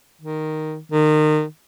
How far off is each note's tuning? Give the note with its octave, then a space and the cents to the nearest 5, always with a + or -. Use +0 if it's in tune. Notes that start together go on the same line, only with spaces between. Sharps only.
D#3 +0
D#3 -25